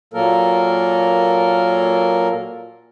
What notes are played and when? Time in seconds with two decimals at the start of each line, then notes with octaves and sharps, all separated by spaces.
0.14 A#2 F#3 A#3 A4 A#4